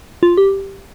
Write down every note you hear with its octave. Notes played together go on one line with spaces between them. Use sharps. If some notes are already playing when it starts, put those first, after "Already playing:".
F4
G4